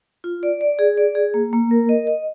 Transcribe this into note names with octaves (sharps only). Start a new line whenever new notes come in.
F4
D5
D5
G#4
D5
G#4
A#3
A#3
A#4
D#5
D#5